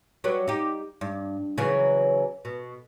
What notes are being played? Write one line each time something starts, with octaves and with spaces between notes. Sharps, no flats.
F#3 G3 B4
D#4 G4
G2
C#3 E3 F#3
B2